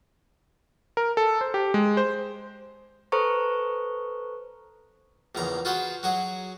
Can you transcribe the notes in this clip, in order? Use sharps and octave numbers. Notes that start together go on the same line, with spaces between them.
A#4
A4
C5
G4
G#3
C5
A4 B4 C5 A#5 C#6
A#1 E2 C#3 A#5
F4 F#4 G#4 B4 C5
F#3 F#4 G#4